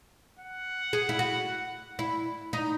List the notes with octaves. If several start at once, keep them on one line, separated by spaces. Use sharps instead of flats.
F#5
G#4
E4
F#4
E4
D#4